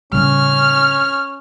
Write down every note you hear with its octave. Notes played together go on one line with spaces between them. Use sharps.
A2 C#3 G3 C#4 F6